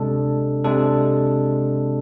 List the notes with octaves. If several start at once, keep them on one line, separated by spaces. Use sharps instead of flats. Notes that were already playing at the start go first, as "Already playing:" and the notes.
Already playing: C3 G#3 D4 A4
C3 G#3 D4 A4